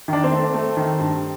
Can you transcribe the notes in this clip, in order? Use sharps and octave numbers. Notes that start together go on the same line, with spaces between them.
D#3 D4
C4
A3
A3
D#3
G2